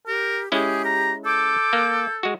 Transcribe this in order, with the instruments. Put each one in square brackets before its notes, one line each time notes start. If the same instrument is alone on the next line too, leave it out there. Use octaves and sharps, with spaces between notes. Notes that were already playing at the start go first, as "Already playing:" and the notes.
[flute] G4 [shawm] A#4
[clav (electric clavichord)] G#3 C#4 E4 [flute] G4 [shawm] G#4
[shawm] A#5
[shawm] A4 [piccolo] D6 [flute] G6
[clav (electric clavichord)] A#3
G#3 F#4